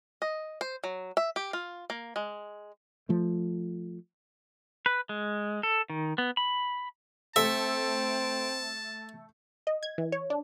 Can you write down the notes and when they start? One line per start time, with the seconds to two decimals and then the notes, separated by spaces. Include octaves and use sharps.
0.22 D#5
0.61 C5
0.84 F#3
1.17 E5
1.36 G4
1.53 F4
1.90 A#3
2.16 G#3
3.09 F3 A3
4.86 B4
5.09 G#3
5.63 A4
5.90 D#3
6.18 B3
6.37 B5
7.36 A3 C4 A4 E5 A5
9.67 D#5
9.83 G#6
9.98 E3
10.12 C#5
10.30 D4